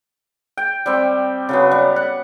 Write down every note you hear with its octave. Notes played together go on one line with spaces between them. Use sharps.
G5
G3 C4
C#3 F#3 B3
G3
F#5